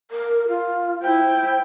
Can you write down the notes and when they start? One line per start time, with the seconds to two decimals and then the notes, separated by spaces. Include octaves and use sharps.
0.11 A#4
0.48 F4
1.02 E4 C5 G5